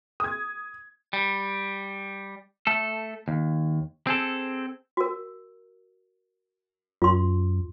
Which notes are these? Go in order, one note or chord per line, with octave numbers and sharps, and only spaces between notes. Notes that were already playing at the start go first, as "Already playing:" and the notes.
D#6 G#6
G3
A3 A4
D#2
C4 G#4 A4
F#4 A#4
F#2 F4 C6